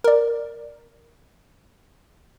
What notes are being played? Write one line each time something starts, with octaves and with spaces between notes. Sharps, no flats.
A#4 D5